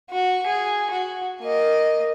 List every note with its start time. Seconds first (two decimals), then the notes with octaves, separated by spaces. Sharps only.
0.10 F#4
0.46 G#4
0.90 F#4
1.41 A#3 D#5